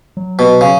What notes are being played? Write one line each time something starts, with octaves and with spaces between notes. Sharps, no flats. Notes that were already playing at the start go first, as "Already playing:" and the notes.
F#3
B2
C#3